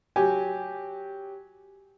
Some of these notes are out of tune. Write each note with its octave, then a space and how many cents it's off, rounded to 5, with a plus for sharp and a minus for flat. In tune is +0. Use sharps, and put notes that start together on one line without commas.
F#3 +0 G4 +0 G#5 +0